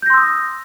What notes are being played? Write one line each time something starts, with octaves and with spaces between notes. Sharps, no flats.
C6 D#6 E6 G6 A#6